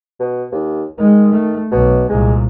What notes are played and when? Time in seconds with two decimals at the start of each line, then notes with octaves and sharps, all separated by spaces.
0.20 B2
0.52 D#2
0.98 D#3 G#3
1.32 A3
1.71 B1 B2
2.09 C2 A#2 G#3